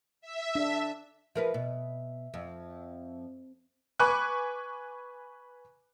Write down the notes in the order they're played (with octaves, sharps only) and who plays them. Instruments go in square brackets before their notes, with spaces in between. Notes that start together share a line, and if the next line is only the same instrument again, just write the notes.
[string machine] E5
[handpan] D4
[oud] F3 A#4 B4 [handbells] E5
[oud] B2
F2
[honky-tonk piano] B4 G#5 C#6 D6 F#6